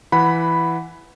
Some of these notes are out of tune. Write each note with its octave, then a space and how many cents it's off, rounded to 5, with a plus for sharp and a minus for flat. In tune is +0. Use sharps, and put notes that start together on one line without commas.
E3 +10 F#5 +0 B5 +0